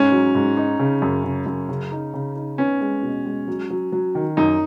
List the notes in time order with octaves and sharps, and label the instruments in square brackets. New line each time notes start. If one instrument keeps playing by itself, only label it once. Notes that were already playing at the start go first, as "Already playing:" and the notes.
Already playing: [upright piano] G#2 [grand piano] C#4
[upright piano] F#3
G#2
D#4
C#3
F#2
C#3
F#2
C#3
D#4
C#3
D#4
[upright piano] B3 [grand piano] C#4
[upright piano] G#3
B2
G#3
F#3
F#3
F#3
D#3
[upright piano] F#2 [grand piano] D#4